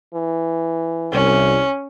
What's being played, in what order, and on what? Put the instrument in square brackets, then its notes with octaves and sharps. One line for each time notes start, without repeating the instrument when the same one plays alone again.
[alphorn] E3
[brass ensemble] C2 [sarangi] C#4